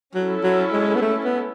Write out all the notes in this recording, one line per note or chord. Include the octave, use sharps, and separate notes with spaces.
F#3 C#4 E4 A4
F#3
G#3
B3
A3
B3